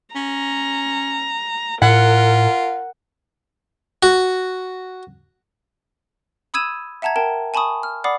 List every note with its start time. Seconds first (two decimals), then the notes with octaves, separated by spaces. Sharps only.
0.15 C#4 A#5
1.82 A2 F4 A#4 F#5
4.03 F#4
6.54 B5 D#6 E6 G#6 D#7 E7
7.02 E5 F#5 A5 A#5 G#6
7.16 A#4 G5 A5
7.54 G#5 A5 B5 C#6 D#6
7.83 F6
8.04 D5 F#5 B5 D6 D#6 C7